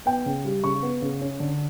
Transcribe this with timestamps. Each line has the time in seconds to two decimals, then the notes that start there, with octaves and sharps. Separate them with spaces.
0.06 B3 G5
0.26 C#3
0.45 G3
0.64 C#3 C#6
0.82 B3
1.02 C#3
1.21 C#4
1.40 D3